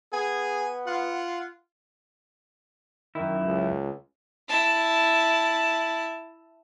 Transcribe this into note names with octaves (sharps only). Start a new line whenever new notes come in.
B3 G#4 G#5
F4 F#5
F#2 D#3 E4
C#2
E4 A5